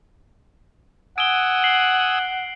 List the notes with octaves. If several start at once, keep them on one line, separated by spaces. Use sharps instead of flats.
F#5 G#5 D#6 E6 D7 G7
C7 F#7 G7